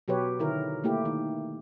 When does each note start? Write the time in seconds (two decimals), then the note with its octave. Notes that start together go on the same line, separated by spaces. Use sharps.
0.08 B2 F#3 G4 B4 C#5
0.39 D3 D#3 E4 A#4
0.84 A3 A#3 E4 G4
1.05 D#3